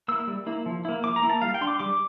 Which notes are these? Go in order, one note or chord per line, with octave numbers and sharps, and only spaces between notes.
A#3 E4 E6
G3
A#3 E4
F3
A#3 E4
F3 D6
A#5
A#3 E4
A5
G3 F5
G5
D4 C6
D6
G3 D6